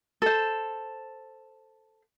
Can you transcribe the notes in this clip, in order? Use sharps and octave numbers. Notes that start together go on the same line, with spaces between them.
A4 C5